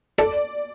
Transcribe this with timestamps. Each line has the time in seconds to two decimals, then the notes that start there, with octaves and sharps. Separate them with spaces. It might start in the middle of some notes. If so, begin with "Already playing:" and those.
0.18 A4 D5